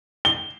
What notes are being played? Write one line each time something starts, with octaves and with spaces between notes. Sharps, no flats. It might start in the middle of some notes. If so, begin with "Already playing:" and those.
G7